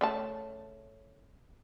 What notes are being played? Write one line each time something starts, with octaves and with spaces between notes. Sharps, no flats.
C#3 A3 A5